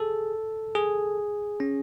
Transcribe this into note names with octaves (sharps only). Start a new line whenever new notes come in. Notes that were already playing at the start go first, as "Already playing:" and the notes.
Already playing: G#4 A4
G#4
C#4